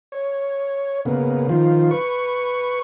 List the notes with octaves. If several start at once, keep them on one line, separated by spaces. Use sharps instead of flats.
C#5
C#3 A#3 B3
D#3 F3 F4
B4 C#6